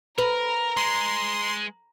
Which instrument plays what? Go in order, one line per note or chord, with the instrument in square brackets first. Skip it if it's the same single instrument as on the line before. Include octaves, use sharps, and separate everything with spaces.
[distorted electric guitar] A#4 [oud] B4 [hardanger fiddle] A#5
[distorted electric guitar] G#3 [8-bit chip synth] C6